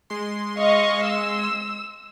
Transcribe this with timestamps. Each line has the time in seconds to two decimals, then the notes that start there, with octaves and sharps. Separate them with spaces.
0.10 G#3 C6
0.58 D#5 F5 C#6
1.07 E6